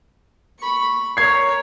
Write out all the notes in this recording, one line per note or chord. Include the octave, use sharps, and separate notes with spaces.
B5 C#6
A#4 C#5 C#6 G#6 C7